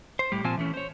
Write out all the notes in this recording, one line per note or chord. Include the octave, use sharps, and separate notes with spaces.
C5
A2 G3 G4
A#2 F3 C4 F4 G#5 A5
E3 A3 C#4
C5 C#5